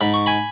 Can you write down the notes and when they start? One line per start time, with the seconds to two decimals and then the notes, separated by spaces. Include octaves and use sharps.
0.01 G#2 B5
0.14 C#6
0.26 G#5 B5